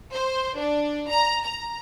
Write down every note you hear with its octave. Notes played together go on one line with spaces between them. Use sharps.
C5
D4
A#5
A#5